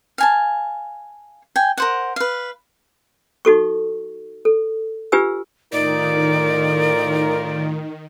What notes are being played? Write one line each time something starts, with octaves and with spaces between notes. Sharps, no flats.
F5 G#5 A5
G5 G#5
A#4 C5 F#5
B4 F5
D#4 F#4 A4 C#6
A4
D4 F4 G4 B4 G#5 E6
A2 D#3 D#4 F4 A#4 D5